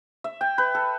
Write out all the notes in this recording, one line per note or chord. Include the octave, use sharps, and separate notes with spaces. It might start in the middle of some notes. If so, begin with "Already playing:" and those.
E5
G5
B4
A4